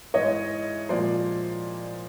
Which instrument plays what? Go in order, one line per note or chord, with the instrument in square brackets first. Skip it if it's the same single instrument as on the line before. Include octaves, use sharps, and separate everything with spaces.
[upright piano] G#2 E3 G#3 C#5 D#5
A#2 F3 G#3 C5 D5